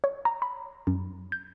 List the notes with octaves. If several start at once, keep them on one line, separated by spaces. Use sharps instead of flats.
C#5
A#5
B5
F#2
G6